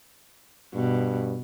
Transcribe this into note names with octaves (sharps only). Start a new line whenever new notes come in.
G2 B2